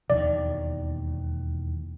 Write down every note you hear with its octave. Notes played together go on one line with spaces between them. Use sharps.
E1 D#2 D#3 D5